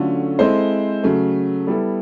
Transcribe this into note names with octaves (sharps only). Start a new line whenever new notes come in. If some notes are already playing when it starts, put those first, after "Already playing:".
Already playing: D3 F#3 A3 C#4 F4
G#3 C4 E4 A4 C5
C#3 F#3 A3
G3 B3 E4 A4